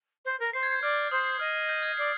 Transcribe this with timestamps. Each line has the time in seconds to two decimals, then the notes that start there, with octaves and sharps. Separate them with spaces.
0.24 C5
0.39 A#4
0.53 C5 C7
0.63 G#6
0.72 G6
0.81 D5 F6
1.11 C5 D#6
1.39 D#5 F6
1.69 G6
1.82 G#6
1.97 D5 C7